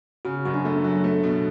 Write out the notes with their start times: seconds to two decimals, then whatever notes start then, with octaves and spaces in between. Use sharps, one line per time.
0.25 C#3 F#4
0.46 F#2 F#4
0.54 D4
0.65 A3
0.84 F#3
1.04 A3
1.23 B2